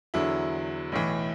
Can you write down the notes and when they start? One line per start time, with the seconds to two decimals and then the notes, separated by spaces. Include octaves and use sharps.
0.14 E2 D3 F#3 E4
0.92 B1 A2 E3